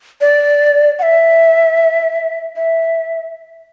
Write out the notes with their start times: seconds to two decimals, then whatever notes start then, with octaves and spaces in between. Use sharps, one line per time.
0.21 D5
0.99 F#5
1.02 E5
2.56 E5